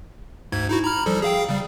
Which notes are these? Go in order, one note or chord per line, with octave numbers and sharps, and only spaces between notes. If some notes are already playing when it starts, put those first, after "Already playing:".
D2 G#2 G#6
D#4 E4 F#4
A#5 B5 F6
F3 G3 A4
G#4 F5 G5
C#3 G3